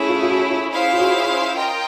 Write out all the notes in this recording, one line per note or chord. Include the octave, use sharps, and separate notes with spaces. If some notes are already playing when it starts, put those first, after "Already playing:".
Already playing: A3 C#4 E4 G#4
F4
F4
F#4
F4
C#4 E4 G#4 C5 F5
F4
F#4
F4
F4 A#4 D#5 G5